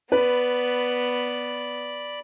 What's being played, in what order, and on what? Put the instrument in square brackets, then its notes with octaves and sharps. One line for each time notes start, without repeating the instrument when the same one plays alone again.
[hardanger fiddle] B3 [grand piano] B4 [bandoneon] D5 B5